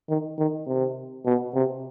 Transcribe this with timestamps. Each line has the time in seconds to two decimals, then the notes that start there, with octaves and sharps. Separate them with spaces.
0.09 D#3
0.38 D#3
0.66 C3
1.25 B2
1.54 C3